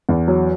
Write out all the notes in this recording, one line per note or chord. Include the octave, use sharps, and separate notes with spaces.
E2
F#3